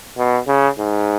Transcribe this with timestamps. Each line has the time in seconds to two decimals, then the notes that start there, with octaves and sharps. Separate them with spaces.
0.18 B2
0.48 C#3
0.78 G#2